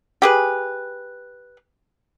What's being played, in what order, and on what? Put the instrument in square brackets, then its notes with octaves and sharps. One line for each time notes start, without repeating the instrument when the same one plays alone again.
[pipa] G4 G#4 B4